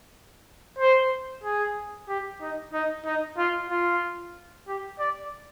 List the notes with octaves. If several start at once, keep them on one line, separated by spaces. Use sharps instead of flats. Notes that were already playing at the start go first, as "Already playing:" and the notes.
C5
G#4
G4
D#4
D#4
D#4
F4
F4
G4
D5